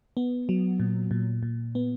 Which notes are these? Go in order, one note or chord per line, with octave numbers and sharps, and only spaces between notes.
B3
F#3
A#2
A#2
A#2
B3